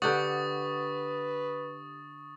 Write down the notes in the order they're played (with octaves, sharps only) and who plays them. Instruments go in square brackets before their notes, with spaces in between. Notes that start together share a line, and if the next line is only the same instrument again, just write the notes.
[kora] D3 G4 F#5 [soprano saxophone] B4 [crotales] C#6 D#6 A6